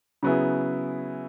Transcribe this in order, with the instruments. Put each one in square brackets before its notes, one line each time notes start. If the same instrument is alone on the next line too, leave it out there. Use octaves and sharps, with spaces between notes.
[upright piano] C#3 F#3 B3 E4 G#4